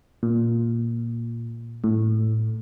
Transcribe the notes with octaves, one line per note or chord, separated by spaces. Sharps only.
A#2
A2